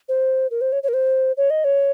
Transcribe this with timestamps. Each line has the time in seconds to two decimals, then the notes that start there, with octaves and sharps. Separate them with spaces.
0.09 C5
0.51 A#4
0.61 C5
0.72 C#5
0.83 C#5
0.89 A#4
0.94 C5
1.37 C#5
1.50 D#5
1.64 C#5